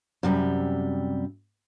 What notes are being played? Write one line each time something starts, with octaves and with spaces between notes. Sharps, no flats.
F#2 C3 G3